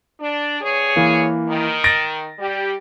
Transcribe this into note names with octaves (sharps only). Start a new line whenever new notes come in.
D4
G2 G#4 C#5
E3 A#3
D#3
A6 A#6 D7
G3 G4